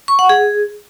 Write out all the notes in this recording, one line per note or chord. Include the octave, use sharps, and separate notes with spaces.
C#6
F#5
G#4